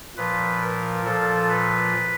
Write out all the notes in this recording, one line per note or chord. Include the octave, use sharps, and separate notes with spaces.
A#2 F3 B4
A#4
A#2 F3 A4
B4